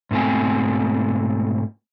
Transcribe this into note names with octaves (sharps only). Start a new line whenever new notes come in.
G#2 B2 A3 C4 G#5